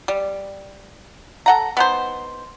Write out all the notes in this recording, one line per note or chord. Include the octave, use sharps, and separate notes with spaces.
G3
A4 F#5 A#5
B3 D#4 C5